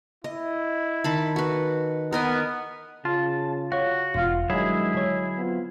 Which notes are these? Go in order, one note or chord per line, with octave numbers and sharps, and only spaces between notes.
E4 D#5
D#3 A5 B5
F#4 B4
B3 A#4 D#5 G#5
C#3 F4 A5
F#4 C#5 F5
E1 F4
G2 D#3 F#3 G#3 E4 G#4 E5
D3 C#5
B3 C4 F4